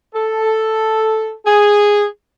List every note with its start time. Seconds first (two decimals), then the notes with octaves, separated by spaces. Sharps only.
0.14 A4
1.46 G#4